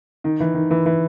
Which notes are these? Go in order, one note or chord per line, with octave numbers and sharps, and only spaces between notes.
D#3
E3
D#3
E3
E3